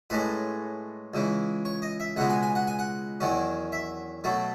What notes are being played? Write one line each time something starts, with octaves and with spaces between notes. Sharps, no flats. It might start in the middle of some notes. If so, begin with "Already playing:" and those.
A2 G#3 C#4 B4
C#2 C#3 E3
C#5
D#5
E5
C#2 B2 G#3 B3 F#5
G#5
G#5
F#5
G#5
F#5
E2 D#3 F#3 C#4
E5
B2 F#3 A3